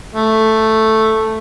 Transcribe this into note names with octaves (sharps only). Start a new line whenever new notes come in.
A3